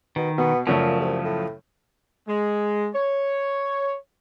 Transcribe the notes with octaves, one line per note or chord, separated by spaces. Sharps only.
B2 D#3
B2 B3
F#2 A#2 C#3 F3 A3
C2
A2
G#3
C#5